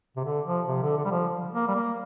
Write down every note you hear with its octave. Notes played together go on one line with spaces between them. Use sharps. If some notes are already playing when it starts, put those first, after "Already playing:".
C3
D3
F3
C3
D3
D3
G3
F3
A#3
G3
A#3